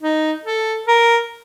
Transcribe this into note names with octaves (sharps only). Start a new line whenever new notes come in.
D#4
A4
A#4